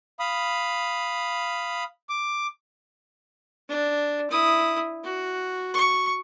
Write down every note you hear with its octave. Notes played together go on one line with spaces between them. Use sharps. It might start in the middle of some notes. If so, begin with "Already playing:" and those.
F5 B5 D#6
D6
D4
E4 D#6
F#4
C#6